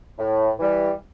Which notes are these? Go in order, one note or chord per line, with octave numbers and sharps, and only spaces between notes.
A2
E3 G3